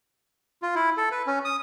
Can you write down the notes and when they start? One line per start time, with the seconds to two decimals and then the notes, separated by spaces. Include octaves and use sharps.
0.62 F4
0.75 E4
0.97 A4
1.11 B4
1.27 C#4
1.45 D#6